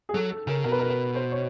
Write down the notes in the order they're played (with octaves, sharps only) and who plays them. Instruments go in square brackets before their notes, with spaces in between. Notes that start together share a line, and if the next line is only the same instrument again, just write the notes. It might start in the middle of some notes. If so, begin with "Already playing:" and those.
[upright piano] G#4
[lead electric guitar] F#3 [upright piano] A4
[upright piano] A4
[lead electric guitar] C#3 [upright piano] A#4
[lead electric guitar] B2 [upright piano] A#4
[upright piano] B4
A#4
B4
C5
C#5